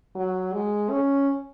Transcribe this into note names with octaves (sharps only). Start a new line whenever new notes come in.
F#3
G#3
C#4